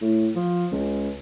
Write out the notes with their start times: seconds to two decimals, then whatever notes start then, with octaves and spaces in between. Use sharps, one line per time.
0.01 A2
0.36 F3
0.72 C#2